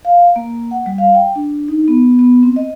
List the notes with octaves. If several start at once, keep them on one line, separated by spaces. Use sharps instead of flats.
F5
A#3
F#5
G3
F5
G5
D4
D#4
B3
B3
C4
D#5